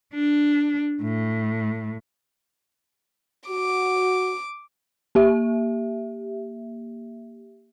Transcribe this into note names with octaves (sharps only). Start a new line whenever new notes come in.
D4
A2
F#4 D6
A#3 G4 E5